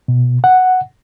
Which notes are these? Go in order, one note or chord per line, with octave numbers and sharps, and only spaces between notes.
B2
F#5